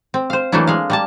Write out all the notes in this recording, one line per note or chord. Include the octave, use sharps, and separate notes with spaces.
C4
C5 F5
E3 F#3 A3 A#3 D4 E4
G#3 F5
G3 A#3 A5